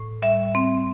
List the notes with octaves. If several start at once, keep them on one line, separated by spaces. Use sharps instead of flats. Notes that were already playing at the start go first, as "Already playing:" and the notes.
Already playing: A2
G3 E5
C4